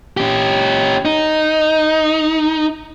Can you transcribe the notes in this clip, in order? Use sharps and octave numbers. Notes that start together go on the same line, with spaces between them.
C#4 G4
D#4